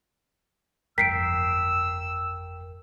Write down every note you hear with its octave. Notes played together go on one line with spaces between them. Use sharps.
G1 F2 A#4 G5 E6 B6 C7 D7